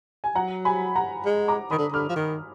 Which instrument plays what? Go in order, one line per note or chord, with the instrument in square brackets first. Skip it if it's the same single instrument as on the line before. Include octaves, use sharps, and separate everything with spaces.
[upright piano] G#5
[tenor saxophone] F#3 [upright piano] F#5 A#5
[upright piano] G#5 B5
F#5 A#5
[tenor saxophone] G#3
[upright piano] A#5 D6
[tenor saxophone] D#3 [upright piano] B5 D#6
[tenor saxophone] D3
[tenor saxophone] D3 [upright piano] D6 F6
[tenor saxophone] F3
D#3